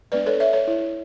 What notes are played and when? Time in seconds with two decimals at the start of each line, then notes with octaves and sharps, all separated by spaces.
0.12 G#3 B3 D4 B4 D5
0.26 A4 C#5
0.40 C#5 E5
0.53 A4 C#5
0.68 E4